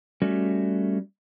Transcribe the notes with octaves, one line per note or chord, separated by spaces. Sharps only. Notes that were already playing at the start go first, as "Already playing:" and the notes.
G3 A3 C#4 F#4